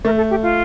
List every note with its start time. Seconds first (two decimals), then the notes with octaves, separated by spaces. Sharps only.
0.05 A3 A#4
0.17 A4
0.30 G4
0.43 F4